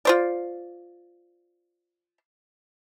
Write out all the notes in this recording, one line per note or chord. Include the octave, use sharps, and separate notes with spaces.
F4 C5 D5